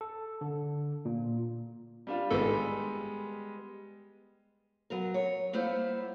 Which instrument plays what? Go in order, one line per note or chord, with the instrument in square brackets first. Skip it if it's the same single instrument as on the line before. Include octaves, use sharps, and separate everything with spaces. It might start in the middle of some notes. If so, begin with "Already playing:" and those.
[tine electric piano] A4
D3
A#2
[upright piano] G3 D4 F4
[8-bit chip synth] G#1 G#2 A4 [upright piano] G3 G#3 B3
[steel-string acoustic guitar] F#3 B3 A#4
C#5
G3 A#3 B3 E4 C5 E5